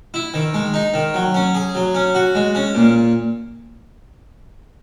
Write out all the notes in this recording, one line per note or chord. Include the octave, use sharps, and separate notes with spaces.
E4
D#3
G#3
D#4
D#3
F#3
C#4
G#4
F#3
C#4
F#4
G#3
C#4
A#2